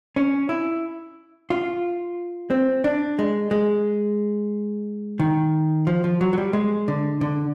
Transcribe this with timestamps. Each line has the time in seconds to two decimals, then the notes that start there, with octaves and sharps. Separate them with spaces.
0.16 C#4
0.49 E4
1.50 F4
2.50 C4
2.84 D4
3.19 G#3
3.51 G#3
5.20 D#3
5.87 F3
6.04 F3
6.21 F#3
6.33 F#3
6.38 G3
6.53 G#3
6.88 D3
7.21 D3